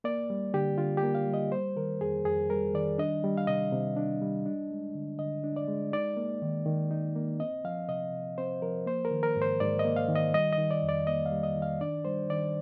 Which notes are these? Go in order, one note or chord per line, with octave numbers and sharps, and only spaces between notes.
A#3 D5
G3
D3 G4
D3 F4
G4
A#3
F5
G3
D#5
G3 C5
D#3 A#4
F2 G#4
F2 G#4
G3 A#4
D#3 D5
D4 D#5
G3
F5
C3 D#5
C3
D4
G3
D4
G#3
D3
D3 D#5
D4
D5
G#3
D#4 D5
A#3
D#3
D#3
D#4
A#3
C4 D#5
F3 F5
C3 D#5
C3
C4 C5
F3 A#4
A#3 C5
A#4
D#3
A#4
G#2
C5
G#2 D5
D#5
A#3
F5
D#3
D#5
G3 D#5
D#5
D#3
D5
F2
D5
A#3 D#5
F5
G3
D#5
D#3
F5
D4 D5
G3 C5
D#3 D5